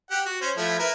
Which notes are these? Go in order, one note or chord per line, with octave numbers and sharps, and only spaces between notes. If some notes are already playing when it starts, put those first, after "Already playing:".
G4 F#5
F#4
C#4 C5
F3 A3 E4
E4 A#4 B4